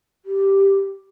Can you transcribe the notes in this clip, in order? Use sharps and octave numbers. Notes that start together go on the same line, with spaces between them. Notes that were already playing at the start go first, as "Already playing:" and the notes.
G4